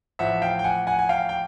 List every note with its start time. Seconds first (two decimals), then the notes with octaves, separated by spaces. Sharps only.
0.19 A1 A2 F3 E5 F#5
0.42 F5 G5
0.59 G5
0.64 F#5 G#5
0.87 F#5 G#5
0.99 G#5
1.09 F5 G5
1.29 G5